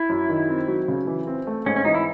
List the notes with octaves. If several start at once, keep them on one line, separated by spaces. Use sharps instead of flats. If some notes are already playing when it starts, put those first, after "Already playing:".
Already playing: E4
F#2
D#3
C4
F#3
C#3
E3
C4
A3
G#2 C#4
C#4
E3 D#4
E4